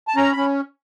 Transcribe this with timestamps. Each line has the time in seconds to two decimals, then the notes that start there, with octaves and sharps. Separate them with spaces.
0.08 A5
0.16 C#4 A#5
0.32 C#4 B5